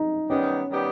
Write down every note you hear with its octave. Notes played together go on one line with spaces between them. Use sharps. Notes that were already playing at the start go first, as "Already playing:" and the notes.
Already playing: D#4
D#3 G3 B3 C#4 D#4 G4
D#3 G3 B3 D#4 G4